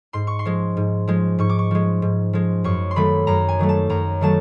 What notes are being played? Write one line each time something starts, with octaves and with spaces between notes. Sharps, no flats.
G#2 C6
C#6
C6
F3 G#3
G#2
F3 G#3
G#2 C#6
D6
C#6
F3 G#3
G#2
F3 G#3
F#2 C#6
C6
D#3 F#3 A3 B5
F#2 A#5
G#5
D#3 F#3 A3
A5
F#2 A#5
D#3 F#3 A3 A5